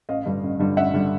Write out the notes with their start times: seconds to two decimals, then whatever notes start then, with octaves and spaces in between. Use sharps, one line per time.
0.09 A1 D#5 F5
0.25 G2 D3 G3
0.43 A1
0.59 G2 D3 G3
0.77 A1 E5 F#5
0.94 D3 G3